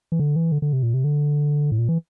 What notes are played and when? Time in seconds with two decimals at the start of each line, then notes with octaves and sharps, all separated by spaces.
0.12 E3
0.19 D3
0.36 E3
0.52 D3
0.62 D3
0.73 C3
0.83 A#2
0.94 C3
1.04 D3
1.72 A2
1.78 A#2
1.88 E3